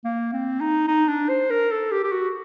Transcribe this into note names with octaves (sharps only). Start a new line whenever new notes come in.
A#3
C4
D#4
D#4
D4
C5
A#4
A4
G4
G4
F#4